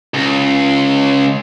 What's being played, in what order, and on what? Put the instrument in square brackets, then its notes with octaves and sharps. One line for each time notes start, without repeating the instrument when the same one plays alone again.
[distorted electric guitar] C#2